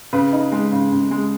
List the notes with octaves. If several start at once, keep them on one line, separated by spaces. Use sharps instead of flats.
C#3 B4
D#4
G#3
C#3
C#3
G#3